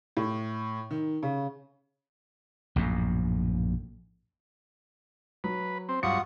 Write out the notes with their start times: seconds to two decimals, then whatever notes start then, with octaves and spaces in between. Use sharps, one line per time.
0.17 A2
0.91 D#3
1.23 C#3
2.76 A#1 F#2 A2
5.44 F#3 B4
5.89 C4
6.03 G2 F#3 F4 F#5 C#6 D#6 C#7